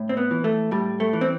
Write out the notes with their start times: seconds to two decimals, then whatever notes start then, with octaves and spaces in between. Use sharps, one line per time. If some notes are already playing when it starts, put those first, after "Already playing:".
Already playing: A2
0.09 C4
0.17 B3
0.31 E3
0.44 A3
0.71 A2 G3
1.00 A3
1.13 E3
1.21 C4